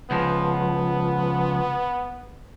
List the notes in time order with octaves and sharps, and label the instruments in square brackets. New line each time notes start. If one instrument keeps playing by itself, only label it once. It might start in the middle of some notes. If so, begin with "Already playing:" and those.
[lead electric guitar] C#2 F3 [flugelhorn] B3